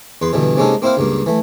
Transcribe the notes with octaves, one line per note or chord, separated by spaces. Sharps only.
E2 B4 C6
G2 B2 D3 E3
C3 G#3 A#3 C#4 D#4 A4
A#3 C4 E4 C5 F5
C#2 G2 A#3
E3 A3